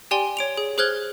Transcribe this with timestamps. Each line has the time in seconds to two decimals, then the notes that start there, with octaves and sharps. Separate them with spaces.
0.11 G4 D5 G5 G#5 C6 G7
0.37 C#5 D7 F7
0.57 G#4
0.78 G#4 C5 F6 F#6 G#6 G7